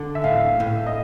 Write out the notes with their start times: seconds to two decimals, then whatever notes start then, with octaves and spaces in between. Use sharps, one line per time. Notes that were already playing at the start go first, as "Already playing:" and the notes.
Already playing: D3
0.15 E5
0.24 A2 F5
0.60 A2
0.86 D#5